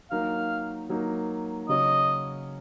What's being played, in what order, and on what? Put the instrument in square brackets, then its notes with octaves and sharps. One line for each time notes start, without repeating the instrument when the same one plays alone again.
[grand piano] F#3 A#3 D#4 A#4 [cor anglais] F5
[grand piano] F#3 A#3 D#4 A#4
[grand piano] C#3 F#3 C#4 [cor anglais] D#5